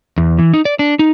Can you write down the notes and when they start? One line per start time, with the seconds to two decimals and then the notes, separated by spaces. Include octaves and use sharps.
0.18 E2
0.39 E3
0.54 D#4
0.65 D5
0.79 D4
0.99 D#4